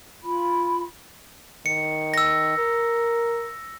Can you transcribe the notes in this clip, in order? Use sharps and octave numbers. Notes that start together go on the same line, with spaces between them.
F4 B5
D#3 C#7
E6 A#6
A#4